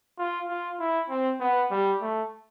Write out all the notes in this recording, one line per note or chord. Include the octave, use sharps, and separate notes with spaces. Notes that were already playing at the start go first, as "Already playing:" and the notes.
F4
F4
E4
C4
B3
G3
A3